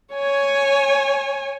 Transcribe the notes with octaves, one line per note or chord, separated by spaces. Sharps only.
C#5 G#5